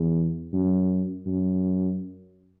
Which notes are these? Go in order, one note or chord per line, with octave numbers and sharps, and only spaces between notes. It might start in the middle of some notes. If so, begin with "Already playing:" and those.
Already playing: E2
F#2
F#2